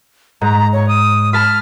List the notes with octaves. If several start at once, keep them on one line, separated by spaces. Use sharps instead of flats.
G#2 A#5
C#5
D#6
A5 B5 F6